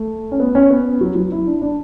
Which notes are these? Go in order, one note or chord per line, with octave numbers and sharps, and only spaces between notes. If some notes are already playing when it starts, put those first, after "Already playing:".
Already playing: A3
C#4
B3
C#4
B3
F#3
F#3
E4
D4
D4